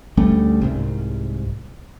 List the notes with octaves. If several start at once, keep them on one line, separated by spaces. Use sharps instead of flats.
D2 G3 A3 C#4
C2 G#2